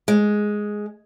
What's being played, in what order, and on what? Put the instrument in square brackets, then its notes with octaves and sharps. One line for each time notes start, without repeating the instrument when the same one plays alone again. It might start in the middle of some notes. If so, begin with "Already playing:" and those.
[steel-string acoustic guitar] G#3